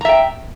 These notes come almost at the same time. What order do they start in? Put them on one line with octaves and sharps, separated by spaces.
A#5 E5 G5